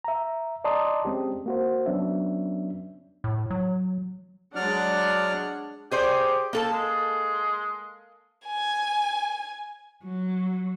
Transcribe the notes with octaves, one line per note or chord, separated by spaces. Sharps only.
E5 A#5
D5 D#5 A5 A#5 C6 D#6
G#3 C4 C#4 G4
A#3 F#4 C5
F#3 B3 C#4 D4 E5
A2
F#3
F#3 G#3 D4 D5 F#5 F6
G4 G#4 C5 D5
A#3 A4 A5
G#3
G#5
F#3